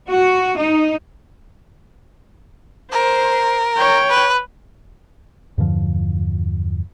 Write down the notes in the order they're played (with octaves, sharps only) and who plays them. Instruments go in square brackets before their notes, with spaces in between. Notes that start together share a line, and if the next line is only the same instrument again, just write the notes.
[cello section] F#4
D#4
[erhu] A#4 [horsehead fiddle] C5
[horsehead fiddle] C#5 G5
[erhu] B4
[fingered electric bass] E2 G2 D3 F3